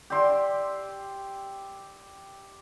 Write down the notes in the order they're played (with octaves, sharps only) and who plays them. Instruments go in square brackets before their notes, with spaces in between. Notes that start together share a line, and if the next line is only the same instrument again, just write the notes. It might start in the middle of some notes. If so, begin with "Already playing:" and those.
[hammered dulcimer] G4 D5 E5 C6